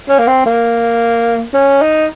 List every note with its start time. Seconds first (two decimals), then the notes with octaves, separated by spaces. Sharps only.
0.09 C#4
0.19 A#3
0.27 C4
0.46 A#3
1.54 C#4
1.82 D#4